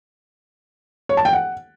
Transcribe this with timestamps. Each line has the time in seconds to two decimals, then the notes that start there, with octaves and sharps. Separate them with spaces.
1.09 C#5
1.17 A5
1.25 G5
1.33 F#5